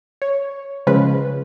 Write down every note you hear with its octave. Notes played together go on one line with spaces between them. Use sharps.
C#5
C#3 F3 G#3 F4 B4